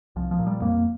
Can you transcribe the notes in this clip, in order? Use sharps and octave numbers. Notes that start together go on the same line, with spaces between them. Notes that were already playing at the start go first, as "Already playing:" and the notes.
C2 F3
F3
A#2
G3
F2 A#3